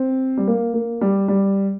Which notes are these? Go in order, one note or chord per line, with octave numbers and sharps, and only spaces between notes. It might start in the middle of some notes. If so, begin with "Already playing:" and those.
Already playing: C4
G3
A#3
A#3
G3
G3